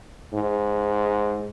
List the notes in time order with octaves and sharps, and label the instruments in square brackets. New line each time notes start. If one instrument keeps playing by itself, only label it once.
[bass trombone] G#2